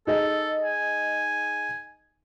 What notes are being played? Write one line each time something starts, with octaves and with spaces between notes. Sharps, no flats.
D#4 G#4 A4 D#5
G#5